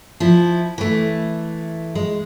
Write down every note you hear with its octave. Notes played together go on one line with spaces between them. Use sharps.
F3 E4
E3 A3
G#3